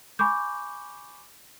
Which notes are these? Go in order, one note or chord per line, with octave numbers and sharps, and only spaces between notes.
G#5 B5 C#6 D6 G6